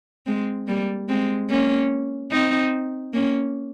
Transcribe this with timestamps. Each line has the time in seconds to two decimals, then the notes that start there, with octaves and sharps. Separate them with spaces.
0.26 G#3 C4
0.67 G3 A#3
1.09 G#3 C4
1.49 A#3 C#4
2.31 C4 D#4
3.14 A#3 C#4